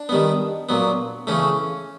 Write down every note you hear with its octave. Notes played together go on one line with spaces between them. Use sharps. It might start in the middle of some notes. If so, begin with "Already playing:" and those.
Already playing: D4
D#3 G3 B3
A#2 F#3 B3
C#3 E3 A3 C#4